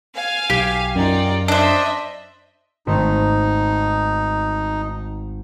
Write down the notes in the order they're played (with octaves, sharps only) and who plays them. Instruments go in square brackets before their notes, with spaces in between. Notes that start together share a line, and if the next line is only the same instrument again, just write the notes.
[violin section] F5 G#5
[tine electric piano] B1 [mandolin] G4
[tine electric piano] F#2 [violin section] D#4 F4 D5
[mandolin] D4 C5 [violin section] D#5 E5
[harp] G#1 A3 C#7 [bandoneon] D#4